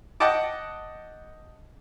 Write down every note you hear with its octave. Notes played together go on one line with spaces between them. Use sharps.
D#5 F#5 G5 A5 D6